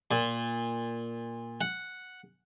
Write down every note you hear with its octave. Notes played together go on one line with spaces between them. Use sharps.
A#2
F#5